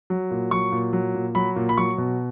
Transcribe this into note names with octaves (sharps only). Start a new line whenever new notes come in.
F#3
A#2
F#3 C#6
A#2
F#3
A#2
F#3 B5
A#2
B5
F#3 C#6
B2